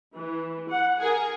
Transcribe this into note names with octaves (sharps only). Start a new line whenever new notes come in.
E3
F#5
G#4 A#4